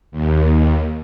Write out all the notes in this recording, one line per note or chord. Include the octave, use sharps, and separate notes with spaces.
D#2